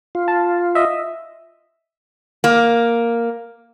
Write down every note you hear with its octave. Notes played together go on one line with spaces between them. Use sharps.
F4
A5
D#5 E5
A#3